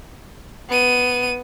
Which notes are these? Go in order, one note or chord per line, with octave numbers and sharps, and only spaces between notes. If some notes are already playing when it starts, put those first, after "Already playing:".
B3 D#7